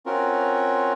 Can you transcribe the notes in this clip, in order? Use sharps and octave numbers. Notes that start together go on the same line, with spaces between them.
C4 C#4 F4 F#4 A#4